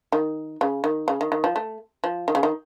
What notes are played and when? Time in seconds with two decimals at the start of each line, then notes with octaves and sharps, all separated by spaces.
0.12 D#3
0.61 C#3
0.84 D#3
1.08 C#3
1.21 D#3
1.32 D#3
1.44 F3
1.56 A3
2.04 F3
2.28 D#3
2.35 C#3
2.43 D#3